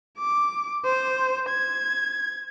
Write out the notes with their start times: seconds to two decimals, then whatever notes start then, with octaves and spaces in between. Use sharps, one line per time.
0.18 D6
0.85 C5
1.49 G#6